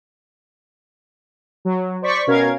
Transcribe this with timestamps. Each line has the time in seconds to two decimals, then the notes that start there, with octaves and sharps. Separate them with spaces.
1.65 F#3
2.02 C5 D5 C#6 B6
2.27 B2 C#4 A#4 F5 G#6